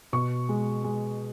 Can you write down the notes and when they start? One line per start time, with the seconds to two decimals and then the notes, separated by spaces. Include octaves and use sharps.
0.13 B2 C#6
0.49 G#3
0.84 G#3